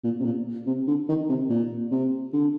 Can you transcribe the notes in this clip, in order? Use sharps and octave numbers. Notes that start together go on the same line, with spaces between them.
A#2
C3
A#2
C3
D3
D#3
C3
A#2
C3
D3